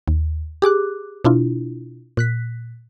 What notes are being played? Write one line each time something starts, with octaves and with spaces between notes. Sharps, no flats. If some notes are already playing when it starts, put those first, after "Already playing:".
D#2
G4 G#4 D6 F#6
B2 D4 E4 F4
A#2 F#6 B6